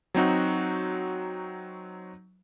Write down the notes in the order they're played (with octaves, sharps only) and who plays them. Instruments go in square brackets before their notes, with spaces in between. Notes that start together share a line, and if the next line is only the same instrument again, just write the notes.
[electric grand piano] F#3 C4 D#4 F#4